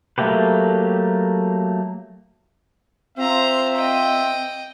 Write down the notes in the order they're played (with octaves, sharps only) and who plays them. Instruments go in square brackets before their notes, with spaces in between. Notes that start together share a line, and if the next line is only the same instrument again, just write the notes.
[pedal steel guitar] F#3 A3 A#3 G4 B4
[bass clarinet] C4 [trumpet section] F4 E5 [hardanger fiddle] C5 A#5
[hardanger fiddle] D#5 G5